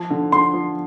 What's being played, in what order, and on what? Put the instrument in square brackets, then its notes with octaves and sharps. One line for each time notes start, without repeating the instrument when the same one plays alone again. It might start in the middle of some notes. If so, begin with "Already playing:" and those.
Already playing: [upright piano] F3
D3
[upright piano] D3 [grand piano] C6
[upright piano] F3